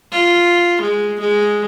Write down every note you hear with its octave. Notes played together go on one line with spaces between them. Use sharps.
F4
G#3
G#3